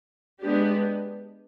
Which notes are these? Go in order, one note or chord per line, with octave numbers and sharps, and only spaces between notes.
G#3 B3 D4 G4